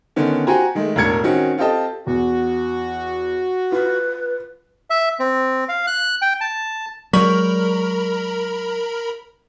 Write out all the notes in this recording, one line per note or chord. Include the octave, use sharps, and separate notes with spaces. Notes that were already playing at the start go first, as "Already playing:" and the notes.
D3 D#3 B3 C#4
F#4 G4 C5 G#5 A#5
D#3 G#3 A3
E1 A2 D4 A#4 G#6 C#7
D#3 C4 C#4 F#4
C4 F4 G4 A4 D#5 A5
E2 F#4
F4 B4
E5
C4
F5
F#6
G5
A5
F#3 G#3 A#4 D5 A#5 B5 C#6 B6